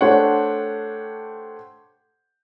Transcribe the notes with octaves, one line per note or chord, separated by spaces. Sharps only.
A3 D4 G4 C5 C#5 F#5